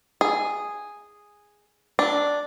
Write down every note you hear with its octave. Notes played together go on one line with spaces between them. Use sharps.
G#4
D4